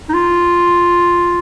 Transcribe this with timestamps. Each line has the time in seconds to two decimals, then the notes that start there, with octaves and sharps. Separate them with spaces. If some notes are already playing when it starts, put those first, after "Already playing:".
0.09 D#4
0.14 F4